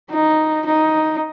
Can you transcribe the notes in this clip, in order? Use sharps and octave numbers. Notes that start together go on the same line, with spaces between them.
D#4
D#4